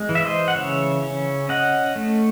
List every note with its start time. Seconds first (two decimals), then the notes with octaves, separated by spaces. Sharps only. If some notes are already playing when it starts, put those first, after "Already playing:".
Already playing: G#3
0.09 E3
0.15 E5
0.25 C5 D#5
0.48 F#5
0.56 C#3 C#5 E5
1.02 C#4
1.49 C#4 D#5 F#5
1.96 A3